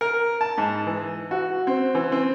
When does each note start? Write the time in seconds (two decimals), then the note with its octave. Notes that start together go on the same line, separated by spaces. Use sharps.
0.01 A#4
0.41 A5
0.58 G#2
0.87 E3
1.31 F#4
1.67 C4
1.95 E3
2.12 C4